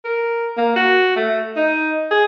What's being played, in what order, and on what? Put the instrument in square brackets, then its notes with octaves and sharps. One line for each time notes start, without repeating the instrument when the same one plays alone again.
[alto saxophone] A#4
A#3
F#4
A3
D#4
G#4